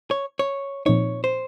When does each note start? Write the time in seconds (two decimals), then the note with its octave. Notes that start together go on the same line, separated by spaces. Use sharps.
0.11 C#5
0.39 C#5
0.86 A#2 F3 C4 D#4 C#5
1.24 C5